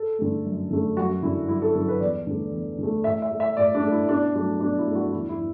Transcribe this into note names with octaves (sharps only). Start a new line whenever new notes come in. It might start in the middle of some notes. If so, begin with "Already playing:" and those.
Already playing: A4
D3 A3
F#2
D3 A3
F#2 F#4
D3 F#3 E4
F#2 E4
A4
D3 F#3 A4
B4
E2 D5
D3 A3
E2
D3 A3
A2 E5
E5
A3
E5
A2 D5
D4
A3
E4
B2 D4
F#3 A3 D4
B2 D4
E4
F#3 A3
F#4
E2 E4
E4
E3